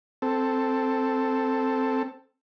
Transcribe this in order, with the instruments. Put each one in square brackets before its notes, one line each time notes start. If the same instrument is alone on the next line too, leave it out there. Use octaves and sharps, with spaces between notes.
[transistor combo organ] C4 A4